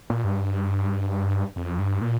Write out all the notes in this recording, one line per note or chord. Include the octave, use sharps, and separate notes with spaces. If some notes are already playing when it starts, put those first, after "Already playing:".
A#2
G2
F2
G2
A#2